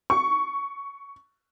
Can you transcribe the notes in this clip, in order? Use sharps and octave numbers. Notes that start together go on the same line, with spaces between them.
C#6